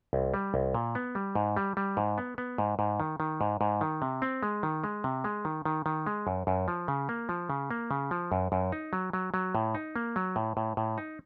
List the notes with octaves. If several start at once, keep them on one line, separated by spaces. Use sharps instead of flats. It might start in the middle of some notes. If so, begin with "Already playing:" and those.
C2
G3
C2
A#2
B3
G3
G#2
G3
G3
G#2
B3
B3
G#2
G#2
D#3
D#3
G#2
G#2
D#3
C3
C4
G#3
D#3
G#3
C3
G#3
D#3
D#3
D#3
G#3
F#2
F#2
F3
C#3
A#3
F3
C#3
A#3
C#3
F3
F#2
F#2
D#4
F#3
F#3
F#3
A2
D#4
A#3
F#3
A2
A2
A2
D#4